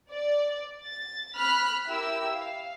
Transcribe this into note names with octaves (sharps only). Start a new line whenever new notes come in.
D5
A6
B5 F6 F#6 B6
E4 G4 A#4 E6
F5